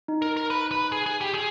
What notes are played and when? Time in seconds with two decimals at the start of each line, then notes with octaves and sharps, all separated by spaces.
0.08 D#4
0.22 A#4
0.37 A#4
0.50 B4
0.71 B4
0.92 G#4
1.06 G#4
1.21 G4
1.34 G#4